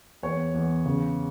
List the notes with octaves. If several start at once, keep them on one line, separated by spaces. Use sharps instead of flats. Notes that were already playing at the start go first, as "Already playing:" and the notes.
E2 C#5
E2
C#3